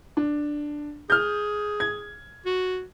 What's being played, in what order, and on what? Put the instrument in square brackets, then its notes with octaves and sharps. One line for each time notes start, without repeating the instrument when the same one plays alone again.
[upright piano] D4
[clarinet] G#4 [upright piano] F6 G6
[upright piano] G#6
[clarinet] F#4